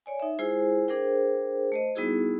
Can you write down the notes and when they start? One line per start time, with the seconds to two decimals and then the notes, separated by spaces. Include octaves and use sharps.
0.06 C#5 D5 G#5
0.20 D#4 E5
0.39 G#3 E4 F4 G#4 C5 G#5
0.88 D4 G#4 A#4 C5 G5
1.72 A3 C5 D#5
1.95 G3 B3 D#4 E4 F#4 G#4